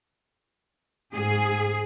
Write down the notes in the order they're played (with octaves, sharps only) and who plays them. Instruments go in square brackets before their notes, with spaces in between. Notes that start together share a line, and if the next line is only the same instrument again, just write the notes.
[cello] G#2 [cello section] G#4